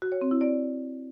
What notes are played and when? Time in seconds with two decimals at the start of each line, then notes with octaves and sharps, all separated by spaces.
0.02 F#4
0.12 C#5
0.21 C4
0.31 E4
0.41 D5